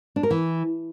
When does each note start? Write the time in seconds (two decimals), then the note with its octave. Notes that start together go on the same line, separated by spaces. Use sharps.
0.16 D4
0.23 A#4
0.30 E3